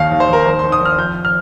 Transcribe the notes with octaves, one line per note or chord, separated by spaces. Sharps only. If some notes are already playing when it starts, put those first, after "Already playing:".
Already playing: D#2 D#3 F5
D#2
C5
D#2 A#4
D#3 C5
D#3 C6
D#6
D#3 F6
F2 G6
F6